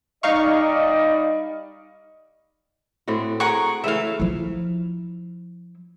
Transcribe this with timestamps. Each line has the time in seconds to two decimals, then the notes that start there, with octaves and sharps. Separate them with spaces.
0.23 G3 D#4 D5 D#5 F5 C#6
3.08 A2 C4 F#4
3.40 G#4 A#4 F#5 C#6
3.84 C#3 E3 A3 E5 F5
4.20 F3 E4